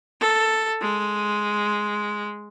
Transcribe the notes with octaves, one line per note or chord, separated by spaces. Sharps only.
A4
G#3